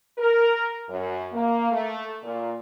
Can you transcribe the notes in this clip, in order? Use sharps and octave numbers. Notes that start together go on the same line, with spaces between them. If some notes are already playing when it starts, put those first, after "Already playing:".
A#4
F#2
A#3
A3
A#2